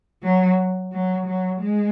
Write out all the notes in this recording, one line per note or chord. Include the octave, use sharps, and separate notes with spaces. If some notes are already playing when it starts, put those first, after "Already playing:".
F#3
F#3
F#3
G#3